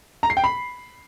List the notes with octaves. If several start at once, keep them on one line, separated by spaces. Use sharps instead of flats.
A#5
C7
G5
B5